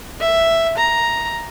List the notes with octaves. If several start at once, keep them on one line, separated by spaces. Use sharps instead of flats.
E5
A#5